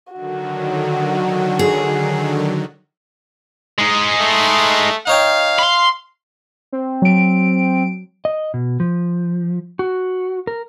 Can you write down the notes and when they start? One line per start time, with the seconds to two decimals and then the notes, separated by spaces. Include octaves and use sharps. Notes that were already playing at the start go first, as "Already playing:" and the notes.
0.13 D3 D#3 F#3 F#4
1.59 G#4
3.79 G#3 D#4
4.20 A3
5.07 D#4 C#5 F5 G5
5.59 B5 C6
6.73 C4
7.02 F#3 D7
8.25 D#5
8.54 B2
8.80 F3
9.79 F#4
10.47 A#4